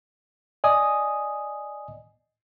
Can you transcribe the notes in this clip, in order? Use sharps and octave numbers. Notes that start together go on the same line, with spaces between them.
D5 D#5 G#5 D#6